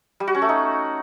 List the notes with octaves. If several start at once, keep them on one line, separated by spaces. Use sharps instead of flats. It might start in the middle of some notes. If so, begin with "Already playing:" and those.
G3
F#4
C#4
A3
D#4